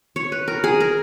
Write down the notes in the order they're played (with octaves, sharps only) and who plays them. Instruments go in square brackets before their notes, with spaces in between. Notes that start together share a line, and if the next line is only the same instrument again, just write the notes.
[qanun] C#5
B4
A#4
G#4
A#4